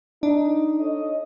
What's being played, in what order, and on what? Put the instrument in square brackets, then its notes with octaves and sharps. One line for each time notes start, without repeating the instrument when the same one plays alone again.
[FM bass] D4 [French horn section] D#4
[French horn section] A4 C#5 D#5